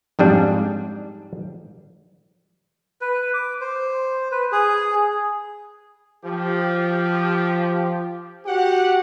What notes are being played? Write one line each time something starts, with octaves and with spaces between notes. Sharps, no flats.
F2 G#2 G3 D4
B4
D6
C5
B4
G#4
F3 G4
F#4 G4 F#5